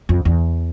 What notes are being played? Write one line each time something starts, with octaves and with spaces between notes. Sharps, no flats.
F2
E2